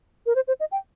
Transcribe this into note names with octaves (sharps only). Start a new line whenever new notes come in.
A#4
C5
C5
D#5
G5